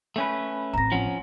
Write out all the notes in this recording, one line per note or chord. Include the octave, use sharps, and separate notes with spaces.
A3 C#4 B4
A1 C4 A#5 A#6
F3 C#4 F#5